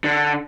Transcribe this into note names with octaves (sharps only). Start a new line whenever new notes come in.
D3